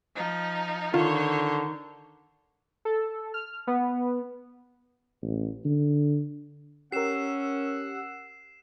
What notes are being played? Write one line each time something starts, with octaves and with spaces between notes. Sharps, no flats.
F3 D#4
D3 D#3 F4 C5 C#5
A4
F6
B3
A1
D3
C#4 G4 A#4 F#5 E6 C7 E7